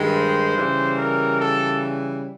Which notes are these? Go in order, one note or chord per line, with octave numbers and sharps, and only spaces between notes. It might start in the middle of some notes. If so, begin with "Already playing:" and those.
Already playing: G2 D#3 G#3
C5
C#3 E3 G3
A#4
A4